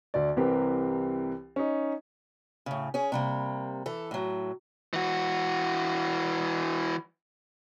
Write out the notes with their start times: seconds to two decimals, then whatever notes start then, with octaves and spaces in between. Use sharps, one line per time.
0.14 D2 D5
0.36 C2 E3 C4 G4 A#4
1.56 C#4 D#4
2.66 A2 C#3
2.94 C#4 G#4
3.12 C3 G3 A#3
3.86 E3 A4
4.11 A2 F#3
4.93 E3 F#4